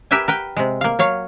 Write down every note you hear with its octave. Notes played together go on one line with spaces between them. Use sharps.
G4 A#4 B4 E5 G5 G#5
A#4 B4 G5
C3 G#3
A#3 F5
F#3 C#5 F5